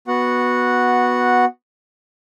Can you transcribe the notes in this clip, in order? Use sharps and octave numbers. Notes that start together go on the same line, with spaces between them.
B3 F#4 F#5